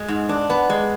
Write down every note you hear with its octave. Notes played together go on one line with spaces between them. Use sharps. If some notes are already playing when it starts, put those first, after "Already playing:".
Already playing: G#3
G#2
D4
B3
G#3